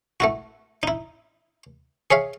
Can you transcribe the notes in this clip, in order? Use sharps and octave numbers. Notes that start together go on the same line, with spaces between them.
A3 E4 F#4
D#4 E4
G#4 C#5 E5 F5